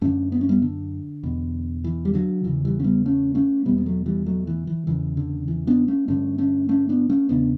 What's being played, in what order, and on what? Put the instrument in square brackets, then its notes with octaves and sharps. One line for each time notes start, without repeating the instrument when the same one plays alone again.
[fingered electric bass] F#2 D3 A3 C#4
B3
C#4
G3 B3
D3
E2 B2
E3
G3
D3 F#3
E2 C#3 E3
E3 G3
C#4
G3 B3
A3 C#4
A3 C#4
B2 G3 B3
E2
B3
F#3 A3
E3 G3
F#3 A3
E3
E3
E2 C#3 E3
D3
E3
B3 D4
A3 C#4
G2 D3 A3 C#4
A3 C#4
A3 C#4
B3 D4
A3 C#4
E2 C#3 B3 D4